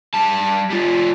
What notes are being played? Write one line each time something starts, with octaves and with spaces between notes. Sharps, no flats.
G3 A5
G3 F4